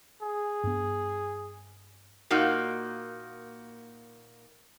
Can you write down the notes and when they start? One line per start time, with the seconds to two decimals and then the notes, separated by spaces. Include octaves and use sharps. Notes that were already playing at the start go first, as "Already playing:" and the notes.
0.22 G#4
0.64 G2 B3
2.30 A#2 A#3 D#4 F#4